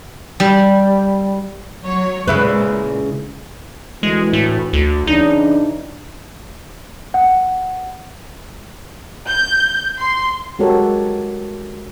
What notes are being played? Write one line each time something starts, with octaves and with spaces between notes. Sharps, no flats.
G3
F#3 C#5
A#2 C#3 G#3 E4 B4
D2 E3 G#3
A2
D2
C#3 E3 D4 D#4
F#5
G6
C6
G#3 F#4 G4 A4 A#4 C#5